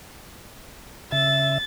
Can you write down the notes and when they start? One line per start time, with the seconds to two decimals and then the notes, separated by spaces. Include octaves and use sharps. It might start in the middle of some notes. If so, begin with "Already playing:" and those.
1.12 C#3 E5 A6